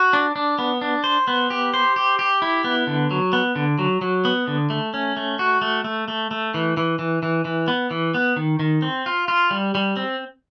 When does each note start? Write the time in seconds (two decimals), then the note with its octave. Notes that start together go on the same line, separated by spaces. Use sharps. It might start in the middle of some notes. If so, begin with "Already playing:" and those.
Already playing: F#4
0.13 D4
0.36 D4
0.59 B3
0.81 D4
1.04 C5
1.28 B3
1.50 G4
1.74 C5
1.96 G4
2.19 G4
2.42 E4
2.64 B3
2.87 D3
3.11 F#3
3.33 B3
3.56 D3
3.79 F#3
4.01 F#3
4.25 B3
4.48 D3
4.70 A3
4.94 C#4
5.17 A3
5.39 F#4
5.62 A3
5.84 A3
6.08 A3
6.31 A3
6.54 E3
6.77 E3
6.99 E3
7.23 E3
7.45 E3
7.68 B3
7.91 E3
8.14 B3
8.36 D#3
8.59 D#3
8.82 C4
9.06 F4
9.28 F4
9.51 G3
9.75 G3
9.97 C4